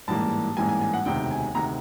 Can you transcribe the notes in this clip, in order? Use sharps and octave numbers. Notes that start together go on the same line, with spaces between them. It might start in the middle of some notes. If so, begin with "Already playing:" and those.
A1 G#2 E3 G3 A#3 A5
A1 G#2 E3 G3 A#3 G#5
G#5
G#5
F#5
E1 D2 C3 D#3 G5
G#5
D2 C3 D#3 A#5